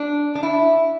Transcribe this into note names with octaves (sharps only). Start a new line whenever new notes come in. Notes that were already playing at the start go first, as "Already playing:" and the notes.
Already playing: D4
D4
E4